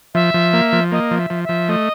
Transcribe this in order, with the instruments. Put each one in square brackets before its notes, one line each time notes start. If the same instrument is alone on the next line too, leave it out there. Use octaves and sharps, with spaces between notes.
[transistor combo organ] F3 [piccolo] E5
[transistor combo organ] F3
A#3
F3
[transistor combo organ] A#3 [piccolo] D#5
[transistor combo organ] F3
[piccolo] E5
[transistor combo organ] F3
[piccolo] E5
[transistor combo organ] F3
[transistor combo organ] A3 [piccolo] D#5